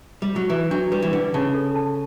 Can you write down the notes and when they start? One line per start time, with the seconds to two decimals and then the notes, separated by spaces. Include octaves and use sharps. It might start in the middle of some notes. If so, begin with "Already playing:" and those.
0.22 G3
0.36 F#3
0.50 E3 B4
0.71 F#3 D4
0.92 G3 B4
1.02 E3
1.13 D3 B4
1.34 C#3 A5
1.55 A4
1.75 A5